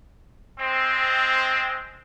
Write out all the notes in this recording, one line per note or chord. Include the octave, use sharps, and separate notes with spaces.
G#3 C4